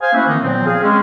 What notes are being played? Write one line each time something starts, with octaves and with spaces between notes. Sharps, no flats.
C5 F5 G#5
A3 A#3 C#4 E4 F#4 E5
D#3 E3 A3 C4 D#4
A#2 F3 F#3 B3 C4
G#4 F5
G#3 C4 C#4